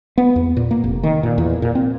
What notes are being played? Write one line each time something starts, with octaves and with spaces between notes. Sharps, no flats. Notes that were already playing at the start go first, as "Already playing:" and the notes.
B3
E2
A#2
A#3
F1
D#3
A#2
E2
A#2
C4